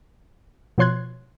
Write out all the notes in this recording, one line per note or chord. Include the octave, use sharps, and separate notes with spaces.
B2 F3 C#5 C6 F#6 G#6